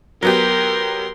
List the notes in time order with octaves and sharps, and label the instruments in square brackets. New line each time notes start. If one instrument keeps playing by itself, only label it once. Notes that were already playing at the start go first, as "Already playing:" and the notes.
[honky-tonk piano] F#3 B3 G4 [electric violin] A#4 C6